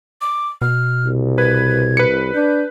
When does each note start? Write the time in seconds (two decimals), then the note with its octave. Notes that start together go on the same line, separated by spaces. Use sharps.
0.21 D6
0.62 B2 F6
1.05 C2
1.38 B4 G#6
1.97 B4 C#7
2.34 D4 G6